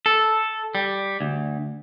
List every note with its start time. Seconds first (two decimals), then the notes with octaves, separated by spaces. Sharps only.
0.06 A4
0.75 G3
1.21 D2